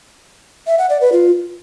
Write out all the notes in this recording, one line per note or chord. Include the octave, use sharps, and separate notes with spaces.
E5
F#5
D5
B4
F4